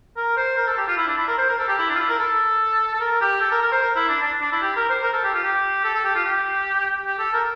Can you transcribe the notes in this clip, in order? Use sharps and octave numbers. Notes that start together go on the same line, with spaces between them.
A#4
C5
A#4
A4
G4
F4
E4
D4
E4
A#4
C5
A#4
A4
G4
E4
D4
F4
E4
A#4
A4
A4
A#4
G4
A4
A#4
A#4
C5
A#4
E4
D4
D4
D4
E4
G4
A#4
C5
A#4
A4
G4
F4
G4
A4
A4
G4
F4
G4
G4
A4
A#4